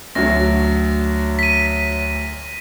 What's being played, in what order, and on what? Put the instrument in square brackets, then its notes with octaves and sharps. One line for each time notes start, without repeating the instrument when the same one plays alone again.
[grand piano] D2 F#3 [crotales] A#6
[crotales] B6 D#7